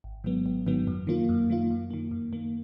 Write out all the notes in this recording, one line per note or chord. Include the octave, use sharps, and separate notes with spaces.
G#1
G#2 D#3 F#3 B3
G#1
G#2 D#3 F#3 B3
F#2
D#3 A#3 F4
F#2
D#3 A#3 F4
F#2
D#3 A#3
F#2
D#3 A#3